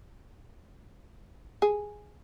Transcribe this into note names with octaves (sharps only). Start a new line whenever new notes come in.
G#4